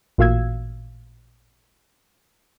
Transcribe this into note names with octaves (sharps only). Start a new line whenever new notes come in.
A1 A#2 F#4 F5 E6 G#6